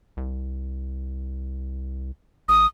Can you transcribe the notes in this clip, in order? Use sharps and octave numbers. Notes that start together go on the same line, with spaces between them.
C2
A1 D#6